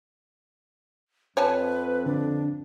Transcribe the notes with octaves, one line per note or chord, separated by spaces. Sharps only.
F2 B4 C#5 G#5 A5
D3 D4